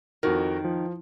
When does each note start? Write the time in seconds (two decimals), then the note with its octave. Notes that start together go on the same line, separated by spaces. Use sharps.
0.23 F2 D#3 F#4 A#4
0.65 F3